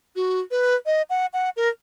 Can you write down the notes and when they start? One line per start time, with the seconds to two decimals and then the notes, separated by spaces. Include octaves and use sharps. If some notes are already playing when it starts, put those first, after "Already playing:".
0.16 F#4
0.51 B4
0.86 D#5
1.10 F#5
1.33 F#5
1.57 A#4